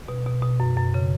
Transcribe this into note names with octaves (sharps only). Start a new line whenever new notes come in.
B2
B2
B2
F#2
F#2
C#3